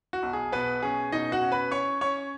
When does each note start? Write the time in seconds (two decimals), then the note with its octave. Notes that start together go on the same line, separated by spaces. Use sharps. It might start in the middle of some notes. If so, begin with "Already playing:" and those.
0.13 F#4
0.23 B1
0.33 G#4
0.52 B2 B3 B4
0.82 C#4 G#4
1.12 B2 D#4 D#5
1.32 F#4 F#5
1.42 C#4
1.52 B4 B5
1.71 C#4 C#5 C#6
2.01 C#4 C#5 C#6